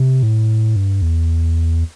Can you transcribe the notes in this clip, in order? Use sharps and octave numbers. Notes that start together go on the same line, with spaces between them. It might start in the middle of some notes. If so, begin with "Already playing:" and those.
Already playing: C3
A2
G2
E2